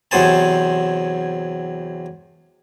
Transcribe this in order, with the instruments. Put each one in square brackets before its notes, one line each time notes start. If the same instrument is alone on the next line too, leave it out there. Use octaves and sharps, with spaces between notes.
[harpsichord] E2 C3 F#3 C5 G#5 A5